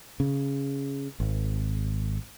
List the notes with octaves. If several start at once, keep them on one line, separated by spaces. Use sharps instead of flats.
C#3
G#1